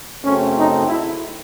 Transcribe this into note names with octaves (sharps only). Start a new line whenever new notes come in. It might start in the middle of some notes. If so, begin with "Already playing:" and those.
F#2 C#3 F#3 A3 C4 C#4
D#4
E4